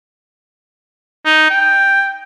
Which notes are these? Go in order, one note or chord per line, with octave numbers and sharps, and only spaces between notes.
D#4
G5